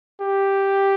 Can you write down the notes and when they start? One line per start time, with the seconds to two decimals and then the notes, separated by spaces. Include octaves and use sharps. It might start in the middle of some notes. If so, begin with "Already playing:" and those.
0.21 G4